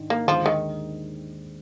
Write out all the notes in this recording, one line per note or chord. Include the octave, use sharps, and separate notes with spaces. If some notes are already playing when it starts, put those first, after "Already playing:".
Already playing: G#2 D#3 D4
A#3
D#2 D3 F3 G#3
D#3